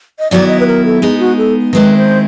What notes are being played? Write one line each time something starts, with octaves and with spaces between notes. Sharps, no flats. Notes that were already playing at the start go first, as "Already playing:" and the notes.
D#5
D#3 F#3 B3 E4 D5
D#5
B4
A#4
A4
G#3 B3 D#4 G#4
F#4
A4
D#3 G#3 C4 E4 B4
C5